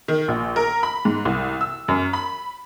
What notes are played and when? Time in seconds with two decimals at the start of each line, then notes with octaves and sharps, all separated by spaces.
0.08 D#3
0.28 A#1
0.56 A#4
0.83 B5
1.05 G#2
1.25 C2
1.61 E6
1.88 F#2
2.13 B5